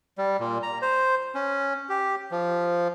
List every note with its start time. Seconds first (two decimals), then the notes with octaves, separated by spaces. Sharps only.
0.18 G3
0.40 A#2
0.63 A#5
0.82 C5
1.35 C#4
1.89 G4
2.32 F3